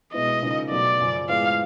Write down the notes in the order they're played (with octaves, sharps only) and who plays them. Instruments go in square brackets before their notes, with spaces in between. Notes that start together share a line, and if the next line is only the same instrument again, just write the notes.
[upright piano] B2 G#3 B3 E4 [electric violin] D#5
[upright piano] C#3 F3 A#3 D#4
[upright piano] B2 F#3 A3 [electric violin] D5
[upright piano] F#2 C#3 F3
[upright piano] A2 F3 G#3 B3 [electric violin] F5